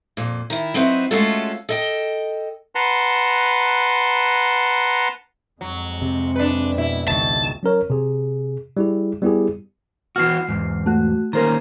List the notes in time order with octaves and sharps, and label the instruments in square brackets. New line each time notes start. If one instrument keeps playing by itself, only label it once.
[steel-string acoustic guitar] F2 A#2
D#3 E4
F#3 C4 D#4 B4 E5
G#3 A3 C#4 F4 F#4 A4
A4 D#5 G5
[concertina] B4 F#5 A5 A#5 C6
[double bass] F2 G#3 [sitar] F#3
[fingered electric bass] C3
[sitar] D4 B4
[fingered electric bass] B2 [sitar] E4
[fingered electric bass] C#2 B2 [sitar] D#3 [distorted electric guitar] A5
[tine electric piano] F#3 C#4 A#4 C#5
C3 G#4
G3 E4 G#4
G3 B3 E4 G4 G#4
[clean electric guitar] E3 B3 F#4 [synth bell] F6 C7
[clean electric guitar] E2 G#2
[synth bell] A3 F#4
[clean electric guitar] D#3 A#3 C#4 [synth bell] A#4 C5 A#5